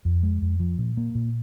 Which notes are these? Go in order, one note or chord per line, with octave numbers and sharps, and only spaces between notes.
F2
G#3
F2
F3
A#2
A#3
A#2